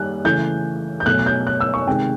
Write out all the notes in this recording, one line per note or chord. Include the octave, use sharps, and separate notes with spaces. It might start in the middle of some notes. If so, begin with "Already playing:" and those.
Already playing: D#3 G3 A#3 F#6
C#3 E3 A3 G6
G6
B2 F#3 A3 F#6
F#6
G6
F#6
E6
C#6
C3 D#3 G#3 G5